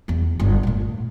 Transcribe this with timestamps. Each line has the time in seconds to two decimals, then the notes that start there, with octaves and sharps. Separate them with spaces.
0.08 E2 F#3
0.40 G1 G3
0.63 A#2 A3